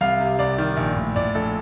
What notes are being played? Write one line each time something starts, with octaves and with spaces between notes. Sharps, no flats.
C2 F5
C3
C2 D5
D#3
A#1
A2
A2 D5
A#1 A4